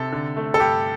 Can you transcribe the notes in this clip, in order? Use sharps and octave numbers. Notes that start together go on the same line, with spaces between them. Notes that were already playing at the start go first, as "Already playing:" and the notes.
Already playing: C3 A4
D3
A3
A4
G2 G4